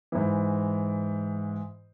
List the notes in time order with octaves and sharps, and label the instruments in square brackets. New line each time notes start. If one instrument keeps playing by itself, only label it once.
[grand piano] G#2 E3